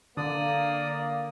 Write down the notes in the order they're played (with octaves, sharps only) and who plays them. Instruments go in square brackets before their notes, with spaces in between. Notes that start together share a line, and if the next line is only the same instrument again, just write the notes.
[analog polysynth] D3 [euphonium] A#3 [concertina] D5 D#6